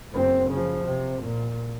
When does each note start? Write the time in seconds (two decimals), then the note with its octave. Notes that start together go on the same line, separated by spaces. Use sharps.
0.12 F#1 C4
0.50 C#3 F3
0.85 C3
1.23 A#2